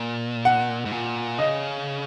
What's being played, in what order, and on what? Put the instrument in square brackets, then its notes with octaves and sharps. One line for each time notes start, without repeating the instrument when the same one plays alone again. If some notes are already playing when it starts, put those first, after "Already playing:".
Already playing: [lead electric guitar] A#2
[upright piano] F#5
[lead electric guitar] G#2
A#2
[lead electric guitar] C#3 [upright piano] D#5